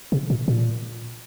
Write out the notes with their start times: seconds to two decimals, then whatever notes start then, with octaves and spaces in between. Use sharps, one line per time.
0.12 C3
0.30 A#2
0.48 A#2